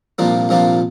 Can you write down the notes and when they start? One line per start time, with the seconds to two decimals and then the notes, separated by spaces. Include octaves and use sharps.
0.19 C2 A#2 F3 A#3 D4
0.49 C2 A#2 F3 A#3 D4